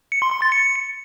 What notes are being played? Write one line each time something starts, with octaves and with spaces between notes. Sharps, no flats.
C#7
C6
C6
A6
C#7